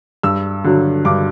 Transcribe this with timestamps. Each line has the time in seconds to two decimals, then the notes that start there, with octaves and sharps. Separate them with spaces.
0.23 G2 E6
0.64 D3 F#3
1.05 G2 D6